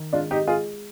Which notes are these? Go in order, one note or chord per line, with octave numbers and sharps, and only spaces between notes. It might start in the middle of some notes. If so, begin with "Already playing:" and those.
Already playing: D#3
G#3 D4 F4
D#4 G4
G#3 F4 G#4